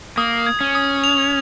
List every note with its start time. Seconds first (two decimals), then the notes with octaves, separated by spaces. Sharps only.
0.17 A#3 D#6
0.46 G#6
0.60 C#4
0.75 D#6
1.04 F7